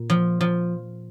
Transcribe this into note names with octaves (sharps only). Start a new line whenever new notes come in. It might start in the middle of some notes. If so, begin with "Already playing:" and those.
Already playing: A#2
F3
F3